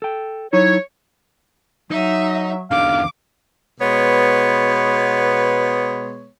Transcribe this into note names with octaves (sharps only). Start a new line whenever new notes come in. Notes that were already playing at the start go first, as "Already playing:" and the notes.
A4 G5
F#3 D#4 E4 C#5
F#3 D#4 E5
E2 D3 F5 D6
B2 G#3 B3 C#5